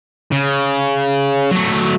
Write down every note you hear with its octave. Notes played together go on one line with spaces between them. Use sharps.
C#3
F#3 A3